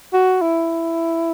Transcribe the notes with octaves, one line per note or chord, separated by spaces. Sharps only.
F#4
E4